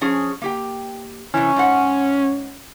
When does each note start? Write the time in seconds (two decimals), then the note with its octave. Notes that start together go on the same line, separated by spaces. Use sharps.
0.01 F3 C#4 G#4
0.42 A#3 G4 G5
1.34 C3 E3 C#4
1.56 G#2 F#5